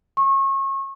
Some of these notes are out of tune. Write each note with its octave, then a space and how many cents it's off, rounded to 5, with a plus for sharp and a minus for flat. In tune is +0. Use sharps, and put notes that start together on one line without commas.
C#6 -30